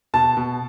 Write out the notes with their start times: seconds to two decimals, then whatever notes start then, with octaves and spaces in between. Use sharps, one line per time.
0.14 B2 A5
0.37 B2